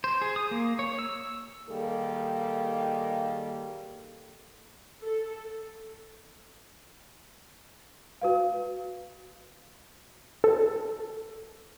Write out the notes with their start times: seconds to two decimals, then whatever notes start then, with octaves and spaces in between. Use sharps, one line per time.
0.04 C5
0.22 G#4
0.36 D#6
0.51 A#3
0.79 C#5
0.99 E6
1.70 D#3 G3 A#3 G#4 A4
5.02 A4
8.21 F#4 B4 F5
10.44 A4